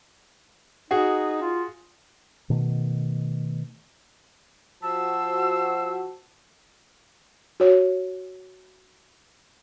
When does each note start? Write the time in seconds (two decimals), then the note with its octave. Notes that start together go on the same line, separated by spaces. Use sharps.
0.91 D#4 F#4 G#4
1.42 F4
2.50 B2 D#3 A3
4.83 F3 F4 F#4 C5 A5 E6
7.60 F#4 C#5